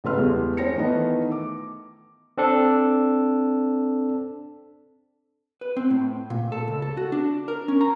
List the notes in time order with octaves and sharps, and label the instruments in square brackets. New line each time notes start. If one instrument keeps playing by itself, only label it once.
[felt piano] A1 C#3 A4 B4 C6 F6
E2 G2 G#3 A3
C#4 C5 G5 A#6 C#7
D#3 E3 A3 B3 D#4
D6
[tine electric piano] C4 D4 A4
[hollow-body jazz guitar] B4
C4
A2
A#2
A4
C#2
A4
F#4
D4
A#4
C#4
A#5